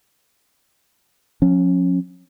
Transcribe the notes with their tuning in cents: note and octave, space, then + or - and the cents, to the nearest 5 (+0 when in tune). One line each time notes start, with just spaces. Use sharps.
F3 +40 C#4 -20